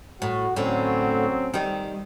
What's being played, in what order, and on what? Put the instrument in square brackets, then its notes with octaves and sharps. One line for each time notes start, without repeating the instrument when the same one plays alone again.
[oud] A2 [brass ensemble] F#4
[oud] A2 D3 [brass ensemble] F#3 C4 C#4
[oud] D#3 G3